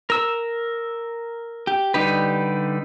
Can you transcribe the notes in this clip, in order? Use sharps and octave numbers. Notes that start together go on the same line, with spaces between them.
A#4 E6
G4
D3 G3 D#4 G4 B4